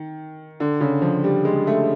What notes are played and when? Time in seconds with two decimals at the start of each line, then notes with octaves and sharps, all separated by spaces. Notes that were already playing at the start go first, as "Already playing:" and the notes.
Already playing: D#3
0.60 D3
0.80 C#3
1.02 F3
1.24 G3
1.45 G#3
1.67 A3